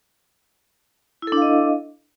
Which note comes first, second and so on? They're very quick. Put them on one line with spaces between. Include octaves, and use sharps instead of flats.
E4 A4 D4 F5 D#5